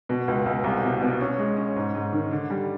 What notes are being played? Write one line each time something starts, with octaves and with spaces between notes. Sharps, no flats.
B2
C#2
C#2
C2
B2
B2
C#4
G#3
C#4
G#2
G#2
D#3
D3
G3